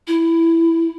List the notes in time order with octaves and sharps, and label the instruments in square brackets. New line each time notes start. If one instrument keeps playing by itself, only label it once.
[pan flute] E4